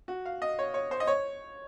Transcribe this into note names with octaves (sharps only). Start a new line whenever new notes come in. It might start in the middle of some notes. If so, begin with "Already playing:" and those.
F#4
F5
D#5
C#5
C#5
C5
D#5
C#5